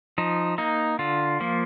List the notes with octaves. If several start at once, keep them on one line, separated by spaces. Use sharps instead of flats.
F3 D#4
A#3 D#4
D3 F4
F3 A#3